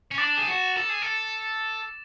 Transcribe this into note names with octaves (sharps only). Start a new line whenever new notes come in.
C#4
D4 D6 A6 E7
G#4
F#4
A4
G#4
A4